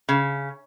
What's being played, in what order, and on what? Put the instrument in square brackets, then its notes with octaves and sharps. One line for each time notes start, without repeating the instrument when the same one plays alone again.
[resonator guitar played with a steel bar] C#3